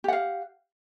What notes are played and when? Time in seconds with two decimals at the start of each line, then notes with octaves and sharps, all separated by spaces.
0.04 G4
0.08 F#5
0.13 F5